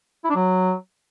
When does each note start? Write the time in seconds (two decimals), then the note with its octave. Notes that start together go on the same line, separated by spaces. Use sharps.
0.24 E4
0.30 D4
0.35 F#3